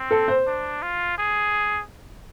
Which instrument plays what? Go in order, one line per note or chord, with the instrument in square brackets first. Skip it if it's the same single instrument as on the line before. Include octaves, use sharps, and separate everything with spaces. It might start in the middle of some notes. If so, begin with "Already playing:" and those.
Already playing: [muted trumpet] C4
[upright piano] A4
C5
[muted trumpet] D4
F4
G#4